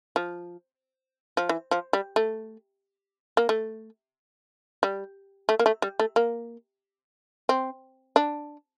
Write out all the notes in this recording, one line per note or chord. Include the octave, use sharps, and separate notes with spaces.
F3
F3
E3
F3
G3
A3
A#3
A3
G3
A3
A#3
A3
G3
A3
A#3
C4
D4